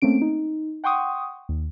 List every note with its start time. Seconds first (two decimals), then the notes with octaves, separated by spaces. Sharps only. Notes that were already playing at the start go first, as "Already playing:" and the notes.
0.02 A3 A#3 C4 C#4 D7
0.21 D#4
0.84 F#5 G5 C6 C#6 D#6
1.49 D#2